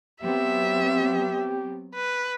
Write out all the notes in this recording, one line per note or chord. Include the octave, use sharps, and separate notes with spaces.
F#3 B3 C4 G4 E5
B4